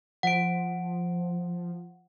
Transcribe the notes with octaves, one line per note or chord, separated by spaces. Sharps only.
F3 F#5 D7